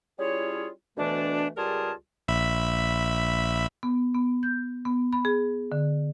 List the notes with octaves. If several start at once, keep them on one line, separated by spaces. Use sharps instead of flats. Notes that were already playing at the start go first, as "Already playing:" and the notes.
G3 C#4 E4 F4 G#4 C#5
D2 B2 E3 A3 D4
C#2 G3 F4 G#4 A#4 A5
A#1 E5 B5
B3
B3
G6
B3
B5
G#4
D3